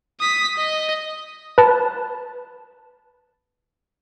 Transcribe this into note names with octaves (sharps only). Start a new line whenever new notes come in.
D#6 B6
D#5
B4 A5